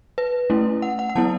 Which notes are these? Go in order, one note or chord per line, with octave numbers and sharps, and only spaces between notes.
B4
A3 C#4 E4
F#5
F#5
F#5
F#3 B3 E4 A5